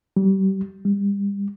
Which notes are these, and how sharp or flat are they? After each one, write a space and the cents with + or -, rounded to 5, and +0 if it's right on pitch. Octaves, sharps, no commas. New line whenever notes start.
G3 -30
G3 +35